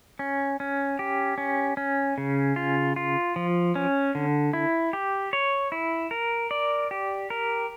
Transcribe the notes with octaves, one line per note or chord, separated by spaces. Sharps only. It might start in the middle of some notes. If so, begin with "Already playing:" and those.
C#4
C#4
G4
C#4
C#4
C#3
F4
F4
F3
C#4
D3
E4
G4
C#5
E4
A#4
D5
G4
A#4